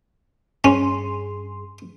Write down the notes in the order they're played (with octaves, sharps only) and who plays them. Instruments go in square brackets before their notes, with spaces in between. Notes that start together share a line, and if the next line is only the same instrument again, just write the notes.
[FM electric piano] G2 G#4 C6 [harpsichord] C#4